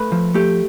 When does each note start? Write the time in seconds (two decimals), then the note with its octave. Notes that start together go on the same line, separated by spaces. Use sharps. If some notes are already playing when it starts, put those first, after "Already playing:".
Already playing: A3 B4
0.12 F3
0.34 A3 G4